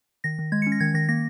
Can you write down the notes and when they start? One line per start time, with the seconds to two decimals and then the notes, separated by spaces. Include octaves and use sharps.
0.24 D#3 A#6
0.39 D#3
0.52 G#3 G#6
0.62 C#7
0.67 C#4
0.72 A#6
0.80 D#3 G#6
0.94 D#3 A#6
1.09 A#3 A#6